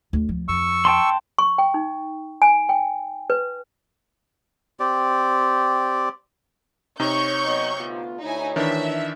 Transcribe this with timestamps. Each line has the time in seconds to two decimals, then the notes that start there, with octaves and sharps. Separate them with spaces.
0.13 D2
0.29 F3
0.48 F2 C#6 E6
0.85 G5 A5 C6
1.39 C#6
1.58 G5
1.74 D#4
2.42 G#5
2.69 G5
3.30 B4
4.80 C4 G4 D5
7.00 C3 D#4 C#5 C#6 G6
7.44 F#3 B3 D#5
7.79 D2 B3 F4
8.21 D2 D#4 E4 C#5 G#5
8.56 D#3 E3 D4 E5